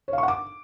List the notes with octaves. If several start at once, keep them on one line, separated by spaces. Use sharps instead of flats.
C#5
F5
C#6
F#5
D6